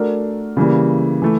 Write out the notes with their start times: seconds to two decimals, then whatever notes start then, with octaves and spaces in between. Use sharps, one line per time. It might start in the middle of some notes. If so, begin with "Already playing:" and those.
Already playing: A3 D4 F#4 A#4
0.57 C#3 E3 G3 A#3
1.22 E3 A3